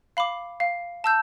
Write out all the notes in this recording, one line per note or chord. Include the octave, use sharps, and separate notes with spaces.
F5 B5 D6
F5
A5 E6 G6